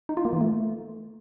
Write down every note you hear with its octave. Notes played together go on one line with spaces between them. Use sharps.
D#4
F4
A#3
E3
A3